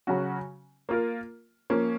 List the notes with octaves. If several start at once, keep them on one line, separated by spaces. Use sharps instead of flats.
C#3 F#3 C#4 F#4
A#3 F4 A#4
F3 A#3 C#4